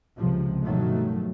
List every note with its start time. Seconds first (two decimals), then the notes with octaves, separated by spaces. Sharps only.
0.17 C#2 C3 F3
0.64 G2 B2 D#3 F3 F#3 A3